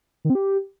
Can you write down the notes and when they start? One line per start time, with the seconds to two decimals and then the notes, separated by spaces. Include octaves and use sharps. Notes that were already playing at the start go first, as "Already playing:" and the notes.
0.25 D#3
0.30 C4
0.35 G4